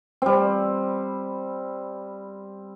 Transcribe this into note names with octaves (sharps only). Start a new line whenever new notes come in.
G3 C4